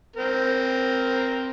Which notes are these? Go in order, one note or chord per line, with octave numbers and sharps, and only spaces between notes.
C4 A#4